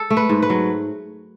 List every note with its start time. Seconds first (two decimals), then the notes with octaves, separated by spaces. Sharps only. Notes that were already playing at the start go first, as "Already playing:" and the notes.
Already playing: A4
0.10 A3
0.17 B4
0.29 G#2
0.42 B4
0.50 F#3